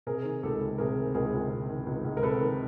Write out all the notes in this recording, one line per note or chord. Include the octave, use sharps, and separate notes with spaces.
C3 G#4 A#4
D#3
C#2 G4 A4
C#2
C3 G#4 A#4
D#3
C#2 G#4 A#4
C#2
C3
D#3
C#2
C#2
A#4
C3 A4 B4
D#3